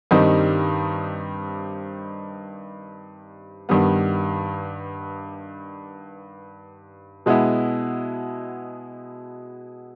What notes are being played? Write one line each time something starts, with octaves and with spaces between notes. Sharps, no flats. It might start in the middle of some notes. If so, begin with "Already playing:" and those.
G2 D#3 G3 C4 D#4
G2 D#3 G3 B3
B2 G#3 B3 E4